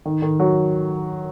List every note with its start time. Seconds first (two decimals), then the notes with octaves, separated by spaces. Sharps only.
0.05 D#3
0.22 D#3
0.40 F#3